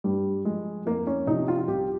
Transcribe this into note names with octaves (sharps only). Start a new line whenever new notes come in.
G2 G3
F3 G#3
F2 A#3
C#4
C3 F3 D#4
F4
F4
C2 G4